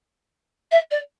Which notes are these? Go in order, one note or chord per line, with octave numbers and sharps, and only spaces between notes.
E5
D5